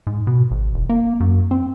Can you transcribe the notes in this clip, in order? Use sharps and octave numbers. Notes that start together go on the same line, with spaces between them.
G#2
B2
G#1
E1
A#3
F#2
C4